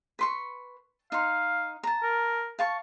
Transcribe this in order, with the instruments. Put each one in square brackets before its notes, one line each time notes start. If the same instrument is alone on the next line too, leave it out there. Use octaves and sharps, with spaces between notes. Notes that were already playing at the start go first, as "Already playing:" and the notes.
[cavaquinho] B4 C6 C#6
[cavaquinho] D#4 C6 [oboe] F5
[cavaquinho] A5 A#5
[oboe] A#4
[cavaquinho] F5 A5 C#6